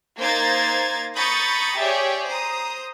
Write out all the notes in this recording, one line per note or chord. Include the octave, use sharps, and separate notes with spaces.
A#3 D#4 C5 A#5 G#6 A6
A#5 B5 C#6 D#6 G6 A6
G4 G#4 C#5 D5 E5
C5 A#5 D#6